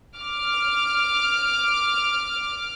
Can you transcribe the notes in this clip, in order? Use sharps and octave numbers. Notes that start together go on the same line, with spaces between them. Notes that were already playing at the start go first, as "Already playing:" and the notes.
D6 F6